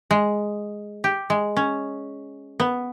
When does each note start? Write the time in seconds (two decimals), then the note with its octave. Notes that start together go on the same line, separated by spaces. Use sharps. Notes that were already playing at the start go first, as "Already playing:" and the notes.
0.11 G#3
1.04 G4
1.30 G#3
1.57 C#4
2.60 B3